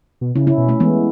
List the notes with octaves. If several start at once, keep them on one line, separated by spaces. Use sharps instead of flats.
B2
C#3 C#4 E4
C#4 E4
B2
A3 C#4
E3 G#3 B3